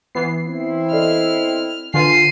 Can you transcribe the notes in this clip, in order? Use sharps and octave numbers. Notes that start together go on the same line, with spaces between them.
E3 B3 C7
C4 E4
A4 D5 D#5 F6
D3 F4 B4 G#5 C7 D#7